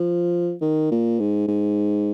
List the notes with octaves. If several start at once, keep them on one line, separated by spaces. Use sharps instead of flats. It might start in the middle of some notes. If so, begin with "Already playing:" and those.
Already playing: F3
D#3
A#2
G#2
G#2